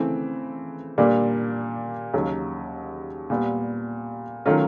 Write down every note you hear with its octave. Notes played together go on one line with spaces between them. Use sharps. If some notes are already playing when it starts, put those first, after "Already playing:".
Already playing: C#3 E3 A3 C4
A#2 G3 A#3 D4
D#2 C#3 F#3
A#2 G3 B3
D#3 F#3 A3 C#4 F4